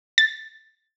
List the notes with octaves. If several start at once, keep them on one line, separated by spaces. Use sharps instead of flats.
A6